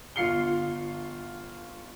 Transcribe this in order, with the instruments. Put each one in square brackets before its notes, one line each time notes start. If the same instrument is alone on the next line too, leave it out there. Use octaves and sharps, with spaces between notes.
[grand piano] G1 F4 F5 C7 C#7 G7